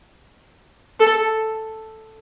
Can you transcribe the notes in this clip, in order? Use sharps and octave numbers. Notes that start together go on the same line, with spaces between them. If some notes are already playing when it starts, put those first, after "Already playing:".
A4